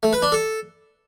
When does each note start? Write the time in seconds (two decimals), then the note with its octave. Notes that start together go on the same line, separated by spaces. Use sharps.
0.03 A3
0.13 B4
0.22 D4
0.32 A4